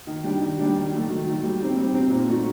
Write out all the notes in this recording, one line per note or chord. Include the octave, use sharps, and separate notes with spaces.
D#3
G3 D4 G4
D#3
G3 D4 G4
D#3
F#3 A3
D#3
F#3 A3
G3
C4 D#4 G4
G3
C4 D#4 G4
A#2
A3 D#4 F#4